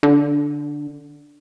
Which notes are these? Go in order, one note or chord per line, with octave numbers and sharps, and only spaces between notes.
D3